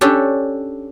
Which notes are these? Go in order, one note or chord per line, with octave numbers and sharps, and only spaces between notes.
C#4 D4 G4 A4